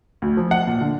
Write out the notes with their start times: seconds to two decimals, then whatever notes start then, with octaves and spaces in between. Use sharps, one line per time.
0.22 D2
0.37 F3
0.51 F#5
0.67 A#2
0.81 D3